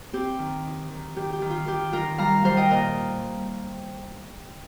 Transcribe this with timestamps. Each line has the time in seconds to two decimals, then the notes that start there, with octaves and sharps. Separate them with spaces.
0.13 C4 G4
0.39 D#3
0.64 D#4
0.91 D#3
1.16 D#3 G4
1.33 G4
1.42 D#3
1.50 F4
1.67 D#3 G4
1.93 D#3 F4 A#4
2.18 G3 F5 A#5
2.44 G3 C5 F5
2.57 D#5 G5
2.70 A#2 A#4 D#5